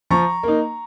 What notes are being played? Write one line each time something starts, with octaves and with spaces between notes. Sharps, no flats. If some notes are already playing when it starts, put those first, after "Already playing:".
F3 A#5 C#6
A#3 D#4